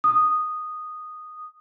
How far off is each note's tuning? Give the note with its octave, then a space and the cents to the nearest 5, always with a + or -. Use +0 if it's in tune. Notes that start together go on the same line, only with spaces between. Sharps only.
D#6 -10